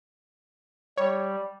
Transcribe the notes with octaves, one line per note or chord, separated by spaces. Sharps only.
G3 C#5